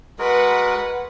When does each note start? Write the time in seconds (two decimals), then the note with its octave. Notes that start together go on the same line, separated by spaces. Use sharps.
0.19 G#3 F#4 A#4 B4 F#5